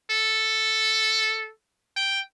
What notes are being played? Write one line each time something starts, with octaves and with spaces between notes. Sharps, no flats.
A4
G5